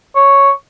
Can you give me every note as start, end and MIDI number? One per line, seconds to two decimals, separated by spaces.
0.15 0.51 73